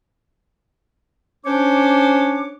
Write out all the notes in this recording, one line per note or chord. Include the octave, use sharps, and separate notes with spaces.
C#4 D4 C5 C#5 D6